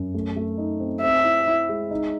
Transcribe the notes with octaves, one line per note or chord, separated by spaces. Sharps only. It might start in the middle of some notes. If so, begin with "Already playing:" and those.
Already playing: F#2
A3
A3
D#4
C4
C4 E5
E4
E4
G#3
D#4